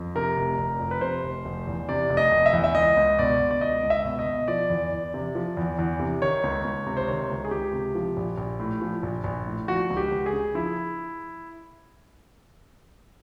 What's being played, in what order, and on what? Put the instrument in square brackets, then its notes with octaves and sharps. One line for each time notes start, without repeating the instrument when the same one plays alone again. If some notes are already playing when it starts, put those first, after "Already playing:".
Already playing: [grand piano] F2
C3 A#4
F1
F1
F2
B4
C3 C5
F1
F1
E2
C3 D5
F1
D#5
F1
E5
E2
E5
C#2 D#5
C#2
B2 D5
B2
D5
C#2 D#5
C#2
E5
B2
D#5
B2
F3 D5
E2
E2
C3
F3
E2
E2
C3
D#3 C#5
C#2
C#2
C3
C5
D#3 C#5
C#2
G#4
C#2 G4
C3
F3
A#1
A#1
A2
F3
A#1
A#1
A2
F3 F#4
C#2
G4
C#2
G#4
C#3
F3 E4